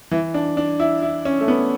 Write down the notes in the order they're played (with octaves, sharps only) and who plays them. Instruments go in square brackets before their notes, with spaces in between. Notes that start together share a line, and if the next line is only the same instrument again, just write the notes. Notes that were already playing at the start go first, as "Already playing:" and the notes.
[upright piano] E3
D4
D4
E4
E4
C#4
A3
B3